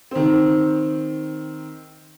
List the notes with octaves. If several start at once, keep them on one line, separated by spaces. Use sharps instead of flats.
D#3 C4